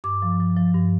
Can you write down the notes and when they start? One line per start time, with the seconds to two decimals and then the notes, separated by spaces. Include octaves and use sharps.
0.04 G2 D6
0.22 F3
0.40 F3
0.57 F3
0.74 G2